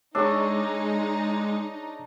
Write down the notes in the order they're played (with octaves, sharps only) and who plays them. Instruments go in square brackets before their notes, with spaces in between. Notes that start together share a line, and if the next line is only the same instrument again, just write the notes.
[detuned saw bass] G#3 [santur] D4 C#6 [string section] D#4 [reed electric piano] G#4 C#5 E6